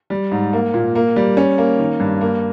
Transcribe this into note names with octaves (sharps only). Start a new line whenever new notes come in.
G3
G#2
A#3
A#2
A#3
G3
C#4
A#3
D#3
G2
A#3